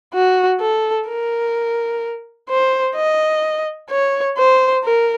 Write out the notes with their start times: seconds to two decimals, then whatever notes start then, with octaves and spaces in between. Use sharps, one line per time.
0.13 F#4
0.60 A4
1.08 A#4
2.49 C5
2.96 D#5
3.90 C#5
4.38 C5
4.84 A#4